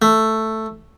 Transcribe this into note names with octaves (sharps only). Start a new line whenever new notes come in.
A3